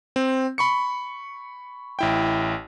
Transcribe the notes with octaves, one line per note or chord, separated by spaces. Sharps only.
C4
B5 C#6 C#7
A1 E4 G5